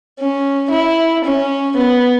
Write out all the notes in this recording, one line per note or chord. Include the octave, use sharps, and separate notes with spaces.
C#4
E4
C#4
B3